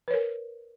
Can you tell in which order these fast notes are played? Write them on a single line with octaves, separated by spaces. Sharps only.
B4 C#5 A#4